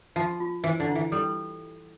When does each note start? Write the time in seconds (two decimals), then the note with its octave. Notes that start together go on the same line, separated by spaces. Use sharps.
0.16 F3 F4
0.40 F4
0.64 E3 C5
0.80 D3
0.88 E4
0.95 E3
1.12 G3 A4